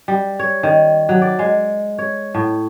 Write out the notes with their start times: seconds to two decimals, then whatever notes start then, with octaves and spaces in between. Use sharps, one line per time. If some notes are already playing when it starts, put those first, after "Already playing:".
0.08 G3
0.39 C#5
0.63 D#3
1.09 F#3
1.22 D5
1.39 G#3
1.99 C#5
2.35 A2